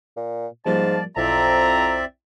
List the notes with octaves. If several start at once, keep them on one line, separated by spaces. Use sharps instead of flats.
A#2
G#2 F3 G3 A#3 D5 F5 A5
B1 F2 C4 E4 D5 E5 A#5